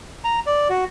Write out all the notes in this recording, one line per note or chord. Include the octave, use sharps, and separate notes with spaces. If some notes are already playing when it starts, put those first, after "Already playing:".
A#5
D5
F#4